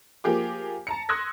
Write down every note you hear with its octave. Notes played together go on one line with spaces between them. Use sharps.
F3 A#3 G4 G#4 D6
A5 A#5 C#7
C6 D#6 E6 F#6 G#6 A#6